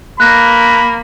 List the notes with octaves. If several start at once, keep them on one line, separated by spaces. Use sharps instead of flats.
A#3 B5 F#6 A#6